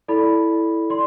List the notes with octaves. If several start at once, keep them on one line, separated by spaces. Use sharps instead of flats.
E4 A4 D5 B5
D5 C6